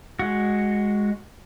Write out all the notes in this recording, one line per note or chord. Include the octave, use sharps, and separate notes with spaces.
G#3 F#4